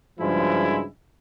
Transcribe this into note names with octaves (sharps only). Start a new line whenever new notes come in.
G2 C#3 F3 F#3 G#3 E4